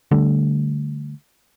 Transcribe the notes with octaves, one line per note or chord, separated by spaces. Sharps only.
D3 G3 A3